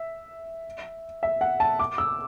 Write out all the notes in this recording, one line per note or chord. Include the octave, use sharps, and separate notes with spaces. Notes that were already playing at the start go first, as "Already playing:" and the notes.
Already playing: E5
E5
F#5
A5
D6
E6